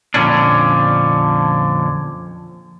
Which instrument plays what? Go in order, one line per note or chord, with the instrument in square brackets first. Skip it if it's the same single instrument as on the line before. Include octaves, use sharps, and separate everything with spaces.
[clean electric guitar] F2 A#2 D3 D#3 C#4 D4